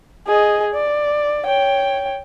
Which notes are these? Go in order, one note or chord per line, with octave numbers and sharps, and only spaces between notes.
G#4 D#5
D5
C#5 G5